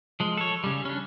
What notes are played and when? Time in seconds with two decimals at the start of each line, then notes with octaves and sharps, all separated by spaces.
0.20 F3 G#3
0.37 A4 C#5
0.64 C#3 G3
0.85 C#4 D4